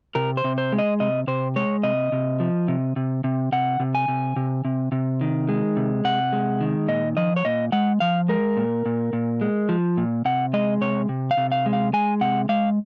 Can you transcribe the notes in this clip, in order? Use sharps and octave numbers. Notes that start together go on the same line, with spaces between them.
C3 A#4
C5
C3
C5
G#3
D#5
C3 D#5
C3 C5
G#3 C#5
C3 D#5
C3
F3
C3
C3
C3
C3 F#5
C3
G#5
C3
C3
C3
C3
D#3
G#3
C3
C3 F#5
G#3
D#3
A#2 D#5
F3 D#5
C#5
A#2 D#5
G#3 F#5
F3 F5
G#3 A#4
A#2
A#2
A#2
G#3
F3
A#2
C3 F#5
G#3 D#5
C3 C#5
C3
F5
C3
F5
G#3
F5
G#3 G#5
C3 F#5
G#3 F5